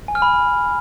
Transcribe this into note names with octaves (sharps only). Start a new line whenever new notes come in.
G#5
F6
B5